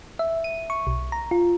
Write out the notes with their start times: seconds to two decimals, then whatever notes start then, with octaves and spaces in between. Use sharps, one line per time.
0.19 E5
0.44 D#7
0.70 C#6
0.87 B1
1.12 A#5
1.31 F4